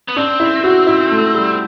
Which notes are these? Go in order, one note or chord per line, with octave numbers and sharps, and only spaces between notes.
B3
C4 D4
E4
F#4
E4
A3
G3